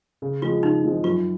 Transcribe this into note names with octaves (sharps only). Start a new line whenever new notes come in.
C#3
F3 G#3 C4 F4
C#3 D#4
F3 G#3 C4
F#2 F4